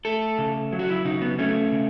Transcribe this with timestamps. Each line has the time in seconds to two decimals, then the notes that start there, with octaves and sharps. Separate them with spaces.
0.05 A3 A4
0.38 C#3
0.73 F#3
0.79 F#4
0.89 E4
1.05 C#3 D#4
1.22 B3
1.39 A3 C#4
1.72 C#3